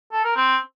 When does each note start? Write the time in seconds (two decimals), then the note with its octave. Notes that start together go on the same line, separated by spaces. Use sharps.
0.12 A4
0.24 A#4
0.36 C4